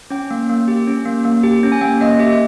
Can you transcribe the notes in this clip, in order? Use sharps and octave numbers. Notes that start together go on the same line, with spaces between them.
C#4 G5
A#3
A#3
G4
C#4
A#3
A#3
G4
C#4
G#5
A#3 G5
A#3 D#5
G4 E5